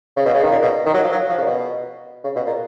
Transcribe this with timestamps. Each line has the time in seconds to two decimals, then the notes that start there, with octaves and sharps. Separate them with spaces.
0.17 C#3
0.25 B2
0.34 C#3
0.42 D#3
0.51 A#2
0.63 B2
0.86 D#3
0.94 F#3
1.03 F3
1.12 F#3
1.29 F3
1.38 C#3
1.42 A#2
1.46 B2
2.24 C#3
2.36 B2
2.47 A#2